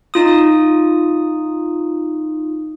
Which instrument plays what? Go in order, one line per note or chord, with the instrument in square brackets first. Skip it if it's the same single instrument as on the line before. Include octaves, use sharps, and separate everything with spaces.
[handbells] D#4 F4 D#6